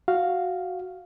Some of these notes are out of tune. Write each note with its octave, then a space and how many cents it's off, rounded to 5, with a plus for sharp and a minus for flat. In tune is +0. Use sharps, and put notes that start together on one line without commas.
F#4 +0 F5 +0